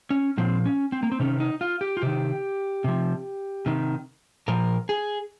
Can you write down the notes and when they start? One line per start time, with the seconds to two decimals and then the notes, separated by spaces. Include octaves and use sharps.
0.10 C#4
0.38 A#2 F3 C4
0.66 C#4
0.92 C4
1.03 A#3
1.12 C4
1.20 C3 D#3 C#4
1.40 D#4
1.61 F4
1.81 G4
1.97 F4
2.02 C3 D#3 G4
2.84 C3 F3
3.66 C3 D#3
4.48 A#2 F3 A#4
4.89 G#4